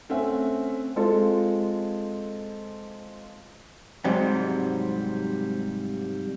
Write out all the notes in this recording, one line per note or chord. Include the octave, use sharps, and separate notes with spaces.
A3 C4 C#4 E5 F#5
G#3 C4 F4 A4
G#2 C3 F#3 G3 C4